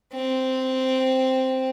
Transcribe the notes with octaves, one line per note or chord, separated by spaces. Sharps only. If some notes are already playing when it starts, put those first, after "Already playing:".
C4